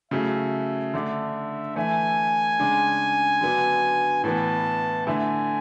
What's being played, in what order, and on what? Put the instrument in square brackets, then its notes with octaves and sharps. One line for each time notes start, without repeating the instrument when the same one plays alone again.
[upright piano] C#3 F#3 A3 E4 [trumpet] E5
[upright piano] D3 A3 D4
[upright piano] E3 A3 E4 [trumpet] G#5
[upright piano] C#3 G#3 D4
D3 F#3 B3 D4
[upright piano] A2 E3 B3 [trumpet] A5
[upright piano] D3 A3 E4 [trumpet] G#5